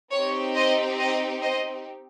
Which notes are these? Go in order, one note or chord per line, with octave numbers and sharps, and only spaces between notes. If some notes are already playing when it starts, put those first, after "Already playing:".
C4 D#4 G4 C#5
C5 D#5
C5 D#5
C5 D#5